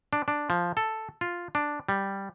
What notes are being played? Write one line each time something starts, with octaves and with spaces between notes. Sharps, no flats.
D4
D4
F3
A4
F4
D4
G3